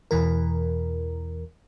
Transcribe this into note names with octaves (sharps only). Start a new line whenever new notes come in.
E2 B2 E3 A#4